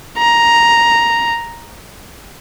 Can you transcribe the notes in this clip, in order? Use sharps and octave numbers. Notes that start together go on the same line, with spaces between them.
A#5